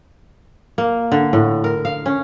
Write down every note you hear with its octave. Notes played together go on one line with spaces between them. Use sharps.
A#3
D3
A2
A#4
F5
C#4